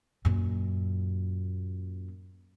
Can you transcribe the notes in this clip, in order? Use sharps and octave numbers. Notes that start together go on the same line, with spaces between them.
F#2 A#2